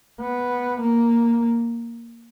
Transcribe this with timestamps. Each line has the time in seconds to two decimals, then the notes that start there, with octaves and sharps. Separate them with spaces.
0.20 B3
0.81 A#3